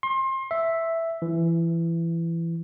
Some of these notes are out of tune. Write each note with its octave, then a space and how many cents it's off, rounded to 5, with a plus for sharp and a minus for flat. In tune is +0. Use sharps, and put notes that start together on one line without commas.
C6 +30
E5 +0
E3 +20